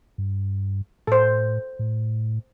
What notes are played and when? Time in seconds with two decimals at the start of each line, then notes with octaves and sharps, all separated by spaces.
0.18 G2
1.07 A2 A4 C5
1.79 A2